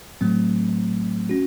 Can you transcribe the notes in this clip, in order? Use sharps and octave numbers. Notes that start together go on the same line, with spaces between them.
A2 F#3 A3 C4
C#4 F#4